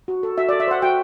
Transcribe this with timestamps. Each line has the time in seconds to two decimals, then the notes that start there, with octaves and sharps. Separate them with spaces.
0.08 F#4
0.23 A4
0.38 F#4 E5
0.49 D5
0.53 A4
0.60 E5
0.67 C5 F#5
0.82 F#4 G5